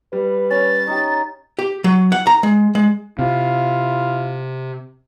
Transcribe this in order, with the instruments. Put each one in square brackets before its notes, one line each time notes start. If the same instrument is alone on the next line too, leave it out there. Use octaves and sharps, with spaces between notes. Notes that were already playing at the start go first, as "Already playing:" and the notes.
[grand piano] G3 [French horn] B4
[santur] C#4 [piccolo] A6
[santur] D#4 G4
[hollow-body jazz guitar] G4
F#3
F#5
A#5
G#3
G#3
[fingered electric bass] C3 [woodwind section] E4 F4 F5